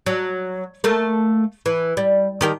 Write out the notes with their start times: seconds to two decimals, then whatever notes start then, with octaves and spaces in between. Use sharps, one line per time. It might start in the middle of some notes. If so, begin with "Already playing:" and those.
0.06 F#3
0.84 A3 A#3
1.66 E3
1.97 G3
2.41 D#3 G4 A#4